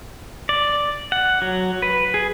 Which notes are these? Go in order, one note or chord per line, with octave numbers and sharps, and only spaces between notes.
D5
F#5
F#3
B4
G#4